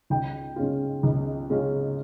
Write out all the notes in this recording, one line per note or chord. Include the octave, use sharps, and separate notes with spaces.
C#2 G5
C#3 G#3 C#4 F4
C#2
C#3 G#3 C#4 F4